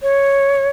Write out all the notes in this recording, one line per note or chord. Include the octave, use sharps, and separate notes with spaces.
C#5